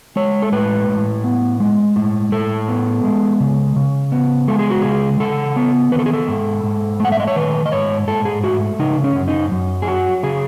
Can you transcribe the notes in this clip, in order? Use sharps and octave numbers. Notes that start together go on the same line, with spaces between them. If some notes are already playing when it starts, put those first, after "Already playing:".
G#3 C#5
A4
A2 B4
A2
B3
G#3
A2
A2 A4
B3
G#3
C#3
C#3
B3
G#3 A4
G#4
F#4
C#3 G#4
C#3 A4
B3
D#3 B4
A4
G#4
A4
G#2
G#2
A3 F#5
E5
D#5
C#5
D#3 B4
D#5
G#2 C#5
G#2 A4
G#4
A3 F#4
C#3 D#4
C#4
F#2
D#4
F#2
G#4
F#3 F#4
C#3 G#4